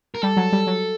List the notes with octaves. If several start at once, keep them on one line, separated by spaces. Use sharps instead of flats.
A#4
G3 A4
F#3
G3
F#3